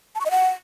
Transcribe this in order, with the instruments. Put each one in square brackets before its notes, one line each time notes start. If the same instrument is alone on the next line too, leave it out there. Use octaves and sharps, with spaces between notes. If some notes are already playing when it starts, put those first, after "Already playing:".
[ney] A5
C#6
D#5
F#5